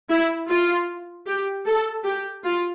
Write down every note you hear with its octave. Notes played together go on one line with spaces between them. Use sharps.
E4
F4
G4
A4
G4
F4